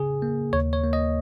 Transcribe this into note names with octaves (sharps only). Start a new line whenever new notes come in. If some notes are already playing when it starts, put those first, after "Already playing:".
Already playing: C#3 G#4
A#3
D#2 C#5
C#5
A#3
D#5